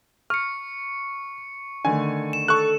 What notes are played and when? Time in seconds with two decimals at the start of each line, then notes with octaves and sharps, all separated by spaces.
0.30 C#6 F6 C#7
1.85 D3 D#3 A3 G#5
2.33 E7
2.48 A4 C#6 F#6